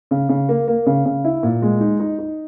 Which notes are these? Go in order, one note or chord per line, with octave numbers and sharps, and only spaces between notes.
C#3
C#3
A#3
A#3
C#3
C#3
E4
A#2
G#3
D#4
D#4
D#4